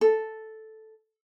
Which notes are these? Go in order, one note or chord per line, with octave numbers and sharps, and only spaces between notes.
A4